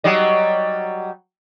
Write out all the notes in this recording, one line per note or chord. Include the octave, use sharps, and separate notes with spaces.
F#3 G3 D#5